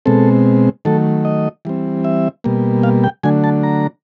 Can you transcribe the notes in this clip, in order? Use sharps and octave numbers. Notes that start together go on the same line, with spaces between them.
B2 G#3 C4 A4
D#3 F#3 A3 A4
D#5
E3 G3 C4
E5
B2 G3 A#3
F5
G5
D3 F#3 A3 D4 G#5
A5
A#5